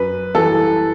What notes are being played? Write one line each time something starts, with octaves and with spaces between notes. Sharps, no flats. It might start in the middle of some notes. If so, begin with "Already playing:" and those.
Already playing: F#2 B4
E3 G3 A4